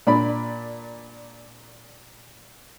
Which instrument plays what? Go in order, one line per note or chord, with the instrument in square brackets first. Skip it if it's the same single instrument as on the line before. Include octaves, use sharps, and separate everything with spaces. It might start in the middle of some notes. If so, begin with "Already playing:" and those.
[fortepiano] A#2 D4 D5 B5